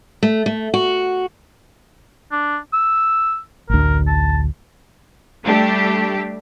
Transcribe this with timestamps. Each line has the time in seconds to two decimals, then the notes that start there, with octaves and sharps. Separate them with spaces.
0.23 A3
0.46 A3
0.74 F#4
2.32 D4
2.73 E6
3.70 A1 D2 A#4
4.07 A5
5.45 G3 A3 D4 G4